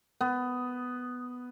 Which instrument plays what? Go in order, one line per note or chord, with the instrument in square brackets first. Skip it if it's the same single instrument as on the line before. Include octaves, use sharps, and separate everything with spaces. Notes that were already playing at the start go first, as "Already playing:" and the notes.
[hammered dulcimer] B3